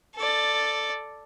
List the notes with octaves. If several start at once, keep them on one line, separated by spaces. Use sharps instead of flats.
A4 D5